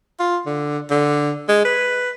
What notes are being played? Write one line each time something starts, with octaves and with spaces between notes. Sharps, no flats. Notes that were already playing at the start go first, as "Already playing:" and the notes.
F4
D3
D3
G#3
B4